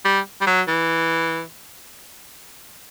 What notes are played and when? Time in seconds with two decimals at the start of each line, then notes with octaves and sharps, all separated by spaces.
0.05 G3
0.41 G3
0.47 F#3
0.68 E3